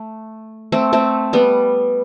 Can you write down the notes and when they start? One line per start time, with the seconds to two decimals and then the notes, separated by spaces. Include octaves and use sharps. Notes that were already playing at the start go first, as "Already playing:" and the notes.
Already playing: A3
0.72 A3 C4
0.93 A3 C4
1.33 G3 B3